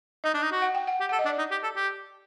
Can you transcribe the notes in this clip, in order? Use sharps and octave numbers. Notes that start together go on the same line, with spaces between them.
D#4 D#5
D4
D#4
F#4
F#5
G5
F#5
G4
A4 F#5
D#5
D4
D5
D#4
G4
A4
G4